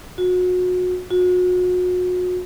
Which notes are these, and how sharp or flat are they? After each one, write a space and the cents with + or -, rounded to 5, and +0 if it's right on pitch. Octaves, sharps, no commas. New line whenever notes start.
F#4 -30
F#4 -35